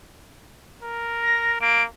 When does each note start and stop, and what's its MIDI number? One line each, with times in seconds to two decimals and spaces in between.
0.83 1.58 70
1.23 1.52 94
1.61 1.86 58
1.61 1.83 98